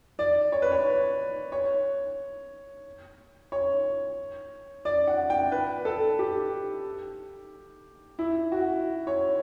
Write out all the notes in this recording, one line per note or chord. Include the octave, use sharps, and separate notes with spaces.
D5
C#5
B4
C#5
C#5
C#5
D5
F#5
G5
B4
A4
G4
E4
F#4
C#5